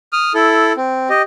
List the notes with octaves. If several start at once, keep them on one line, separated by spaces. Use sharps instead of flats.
D#6 F6
E4 A4
C4
G4 D#5